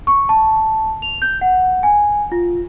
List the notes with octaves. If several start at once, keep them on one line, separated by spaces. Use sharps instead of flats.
C#6
A5
F7
G6
F#5
G#5
F4